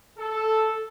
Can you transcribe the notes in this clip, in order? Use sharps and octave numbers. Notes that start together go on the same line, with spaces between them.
A4